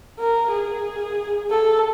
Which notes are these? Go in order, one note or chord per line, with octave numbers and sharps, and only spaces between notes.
A#4
G#4
A4